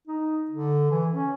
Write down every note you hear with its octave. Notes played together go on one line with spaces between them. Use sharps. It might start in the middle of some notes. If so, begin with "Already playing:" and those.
D#4
D3
E3
C#4